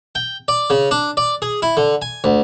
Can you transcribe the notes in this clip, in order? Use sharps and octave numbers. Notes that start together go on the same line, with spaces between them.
G5
D5
C#3
D4
D5
G#4
E4
D3
G#5
D2